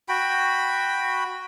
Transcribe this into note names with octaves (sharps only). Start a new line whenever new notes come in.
F#4 G5 B5